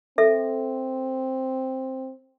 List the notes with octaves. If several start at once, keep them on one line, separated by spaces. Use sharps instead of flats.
C4 A4 E5